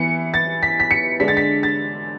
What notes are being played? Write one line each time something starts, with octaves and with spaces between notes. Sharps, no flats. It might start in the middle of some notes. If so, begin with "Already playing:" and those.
Already playing: E3 B3 C#7
A6
B6
B6
C#7
D3 G#3 D4 B6
A6
B6
A6